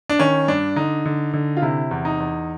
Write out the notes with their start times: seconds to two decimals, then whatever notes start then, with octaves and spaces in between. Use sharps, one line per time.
0.09 D4
0.19 D#3 C#4
0.48 G2 D4
0.76 D3 D#4
1.05 D3
1.33 D3
1.57 F4
1.62 C3 E4
1.91 E2
2.05 D#4
2.20 E2